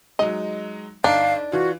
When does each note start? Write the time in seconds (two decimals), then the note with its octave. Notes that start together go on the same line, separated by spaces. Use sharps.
0.19 F#3 G#3 D#4 D#5
1.04 G1 D4 D#4 F5 D7
1.52 E3 F4 F#4